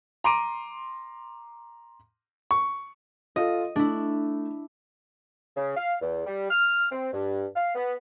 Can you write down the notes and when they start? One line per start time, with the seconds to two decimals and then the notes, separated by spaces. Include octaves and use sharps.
0.24 A#5 C6 D6 D7 D#7
2.51 C#6
3.36 F4 A4 D#5
3.76 A3 D4 E4
5.57 C#3
5.77 F5
6.01 E2
6.26 G3
6.51 F6
6.92 C4
7.13 G2
7.56 F5
7.75 B3